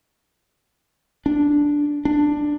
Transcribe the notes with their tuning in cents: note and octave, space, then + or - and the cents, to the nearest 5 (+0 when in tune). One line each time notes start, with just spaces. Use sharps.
D4 -5
D4 +10